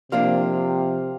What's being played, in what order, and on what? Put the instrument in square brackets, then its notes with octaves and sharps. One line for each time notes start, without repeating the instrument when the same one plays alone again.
[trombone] C3 [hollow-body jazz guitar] F3 A#3 D4 [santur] F5